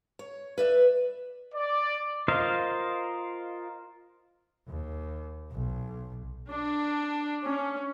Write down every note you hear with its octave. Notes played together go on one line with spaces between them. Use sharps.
C#5
B4 D5 E5
D5
F4 A#4 C5 D#5 F5
D#2
B1
D4
C#4